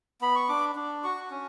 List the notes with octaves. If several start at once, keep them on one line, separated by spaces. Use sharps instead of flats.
B3 B5
C#6
D4 D6
D4
F#4 C#6
C#4